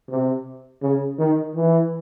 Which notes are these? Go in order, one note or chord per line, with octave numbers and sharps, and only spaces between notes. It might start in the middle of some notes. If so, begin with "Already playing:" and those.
C3
C#3
D#3
E3